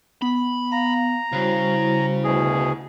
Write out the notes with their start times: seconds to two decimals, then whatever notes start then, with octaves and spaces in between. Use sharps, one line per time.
0.22 B3 B5
0.72 F5 A#5
1.33 C#3 G3 E4 F#4 C5
2.24 D2 B2 G#4